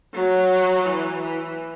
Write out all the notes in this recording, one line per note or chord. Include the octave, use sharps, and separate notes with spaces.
F#3
E3
E3